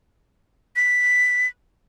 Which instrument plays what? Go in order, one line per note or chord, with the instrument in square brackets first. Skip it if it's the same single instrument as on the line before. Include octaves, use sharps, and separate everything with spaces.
[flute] B6